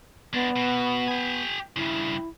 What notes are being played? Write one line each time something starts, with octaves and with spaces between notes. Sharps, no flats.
G#3 B3 D4
B2
G4 G#5
G2 C#3 E4